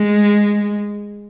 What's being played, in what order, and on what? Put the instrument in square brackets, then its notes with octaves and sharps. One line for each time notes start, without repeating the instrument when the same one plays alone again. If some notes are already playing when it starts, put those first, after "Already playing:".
Already playing: [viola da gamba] G#3